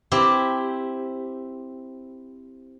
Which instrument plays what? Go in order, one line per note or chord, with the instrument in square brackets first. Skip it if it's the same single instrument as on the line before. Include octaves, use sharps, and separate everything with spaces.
[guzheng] C4 E4 G4